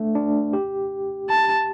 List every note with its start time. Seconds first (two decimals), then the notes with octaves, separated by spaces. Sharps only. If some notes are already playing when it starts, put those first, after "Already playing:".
Already playing: A3 D4
0.15 D4
0.53 G4
1.30 A5